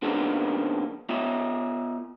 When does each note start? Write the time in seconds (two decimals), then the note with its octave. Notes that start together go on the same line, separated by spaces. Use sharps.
0.02 C#3 F3 A#3 B3 D4 D#4
1.09 B3 F4 D#5 E5